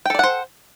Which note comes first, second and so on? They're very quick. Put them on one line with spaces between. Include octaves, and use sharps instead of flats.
G5 A4 D5 F#5 C5